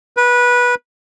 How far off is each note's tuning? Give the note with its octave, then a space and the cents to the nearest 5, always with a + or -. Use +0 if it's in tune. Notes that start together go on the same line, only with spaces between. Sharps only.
B4 -20